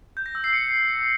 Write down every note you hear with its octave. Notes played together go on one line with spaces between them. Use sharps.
G6
A#6
E6
C7
C#7